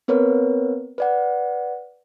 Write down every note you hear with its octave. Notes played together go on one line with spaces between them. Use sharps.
B3 C4 A#4 B4 C#5
B4 D5 F#5